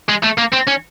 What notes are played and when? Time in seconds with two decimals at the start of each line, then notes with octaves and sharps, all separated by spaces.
0.09 G#3
0.24 A3
0.38 A#3
0.53 C4
0.68 C#4